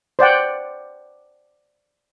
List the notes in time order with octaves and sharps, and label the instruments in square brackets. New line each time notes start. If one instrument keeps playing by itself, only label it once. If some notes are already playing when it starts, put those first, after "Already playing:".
[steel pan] C5 D5 F#5 G5